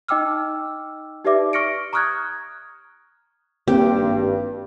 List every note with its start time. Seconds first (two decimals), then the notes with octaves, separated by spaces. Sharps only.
0.08 D#4 D#5 G5 D6 E6 F6
1.25 D#4 G4 B4 D5 E5 D6
1.53 C#6 F6 A#6 C#7 D7
1.93 A#5 C#6 D#6 F6 F#6 G#6
3.68 G#1 G2 A#3 C4 G4